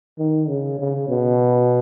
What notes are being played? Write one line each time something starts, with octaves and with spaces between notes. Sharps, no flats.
D#3
C#3
C#3
B2